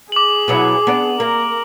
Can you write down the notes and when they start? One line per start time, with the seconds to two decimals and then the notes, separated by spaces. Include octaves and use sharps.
0.12 G#4 D6 F#7
0.48 B2 F#3 E4
0.87 B3 D4
1.20 A#3 A#4